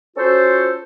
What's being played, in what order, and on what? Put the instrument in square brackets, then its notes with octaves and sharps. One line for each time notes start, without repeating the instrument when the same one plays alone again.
[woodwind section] C#4 F4 F#4 A4 C5